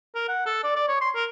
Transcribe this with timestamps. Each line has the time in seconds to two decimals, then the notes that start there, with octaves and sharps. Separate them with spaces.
0.15 A#4
0.29 F#5
0.46 A4
0.64 D5
0.76 D5
0.88 C#5
1.01 C6
1.15 A#4